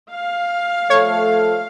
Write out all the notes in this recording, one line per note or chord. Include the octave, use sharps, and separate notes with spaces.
F5
F3 A3 A4 C#5